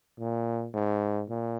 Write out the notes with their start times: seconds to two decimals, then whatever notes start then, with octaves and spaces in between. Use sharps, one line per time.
0.19 A#2
0.74 G#2
1.29 A#2